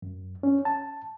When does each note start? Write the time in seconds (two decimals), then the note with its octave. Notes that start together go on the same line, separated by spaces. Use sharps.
0.02 F#2
0.43 C#4
0.65 A5